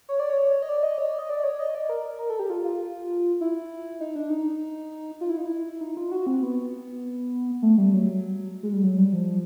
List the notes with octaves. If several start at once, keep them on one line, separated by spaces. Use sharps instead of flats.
C#5
D5
C#5
D#5
D5
D#5
C#5
D5
D#5
D5
C#5
D#5
D5
A#4
A#4
A4
G4
F4
F4
E4
D#4
D4
D#4
F4
E4
D#4
E4
D#4
F4
F#4
C4
B3
A3
G3
F#3
G#3
G3
F#3
G3
F3